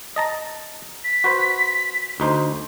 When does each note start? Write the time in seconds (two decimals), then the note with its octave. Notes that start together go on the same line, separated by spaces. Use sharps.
0.16 D#5 A5 A#5
1.04 B6
1.24 F#4 B4 C5
2.20 D2 D#4 C5